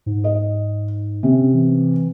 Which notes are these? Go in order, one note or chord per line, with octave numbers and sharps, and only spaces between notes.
G#2
D#5
C3 C#4
E3